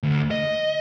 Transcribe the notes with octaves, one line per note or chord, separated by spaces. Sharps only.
D2
D#5